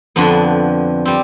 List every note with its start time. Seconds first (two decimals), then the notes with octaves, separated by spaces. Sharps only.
0.16 F2 D3 F3 B3
1.05 G3 C4